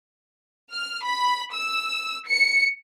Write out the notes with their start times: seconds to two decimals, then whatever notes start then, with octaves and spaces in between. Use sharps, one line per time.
0.73 F6
1.04 B5
1.55 E6
2.28 C#7